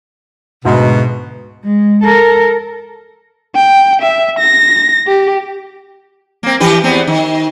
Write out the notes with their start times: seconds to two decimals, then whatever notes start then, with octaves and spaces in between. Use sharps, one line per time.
0.65 D2 G#2 B2
1.65 G#3
2.04 A4 A#4
3.56 G5
4.02 E5
4.39 A#6
5.07 G4
6.43 A#3 C4
6.60 E3 G4 B4
6.84 E2 B3 C4
7.07 D#3